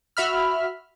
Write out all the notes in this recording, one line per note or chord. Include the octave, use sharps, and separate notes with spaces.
F#4 E5 B5 F6